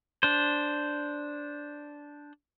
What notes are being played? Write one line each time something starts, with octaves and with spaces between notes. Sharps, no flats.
D4 C5